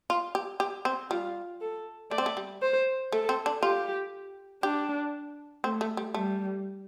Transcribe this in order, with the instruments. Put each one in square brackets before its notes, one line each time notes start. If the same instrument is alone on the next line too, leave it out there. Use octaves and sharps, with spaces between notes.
[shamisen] F4
G4
G4
C4
[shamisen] G3 [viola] F4
[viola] A4
[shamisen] A3 [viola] D5
[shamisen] C4
A3
G3
[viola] C5
[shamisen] A3 [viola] A4
[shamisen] C4
D4
[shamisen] F4 [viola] G4
[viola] D4 [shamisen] G4
[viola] A3 [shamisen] C4
[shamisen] A3
G3
[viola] G3 [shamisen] A3